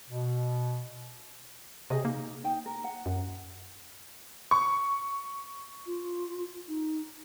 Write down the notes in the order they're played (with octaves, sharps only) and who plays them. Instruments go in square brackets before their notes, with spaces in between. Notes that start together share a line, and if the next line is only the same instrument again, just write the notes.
[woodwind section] B2
[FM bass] C3 [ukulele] G4 G#4 D#5
[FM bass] A#3 [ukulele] D#4
[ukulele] D#4 G5
A#4
F#5
[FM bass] F#2
[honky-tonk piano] C#6
[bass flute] F4
D#4